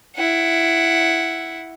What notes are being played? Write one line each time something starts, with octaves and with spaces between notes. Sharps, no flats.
E4 F#5